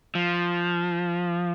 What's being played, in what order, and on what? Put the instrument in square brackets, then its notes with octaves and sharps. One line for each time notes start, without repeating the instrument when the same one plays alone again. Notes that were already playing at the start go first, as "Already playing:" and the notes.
[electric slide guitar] F3